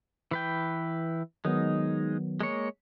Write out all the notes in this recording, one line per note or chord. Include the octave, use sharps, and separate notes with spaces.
E3 B4 G5
D#3 F#3 G#3 B3 D#4
G#3 A#3 C#5